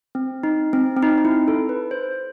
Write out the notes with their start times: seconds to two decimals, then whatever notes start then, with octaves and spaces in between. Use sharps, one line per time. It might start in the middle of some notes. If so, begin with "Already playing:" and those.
0.15 C4
0.43 D#4
0.73 C4
0.97 C4
1.02 D#4
1.18 D#4
1.25 E4
1.48 A4
1.69 B4
1.91 C5